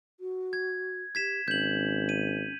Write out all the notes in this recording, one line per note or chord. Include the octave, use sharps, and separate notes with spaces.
F#4
G#6
G4 G#6 B6 E7
G#1 C#4 G6 F#7
D#7